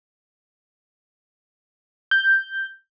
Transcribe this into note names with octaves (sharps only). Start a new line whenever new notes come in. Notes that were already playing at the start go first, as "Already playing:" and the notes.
G6